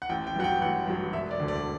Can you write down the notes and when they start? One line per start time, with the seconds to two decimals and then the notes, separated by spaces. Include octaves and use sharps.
0.02 F#5
0.09 A1 G5
0.27 G5
0.36 G2 F#3 F#5
0.44 G5
0.61 A1 F#5
0.88 G2 F#3
1.13 E1 E5
1.31 D5
1.39 D2 D3
1.48 D5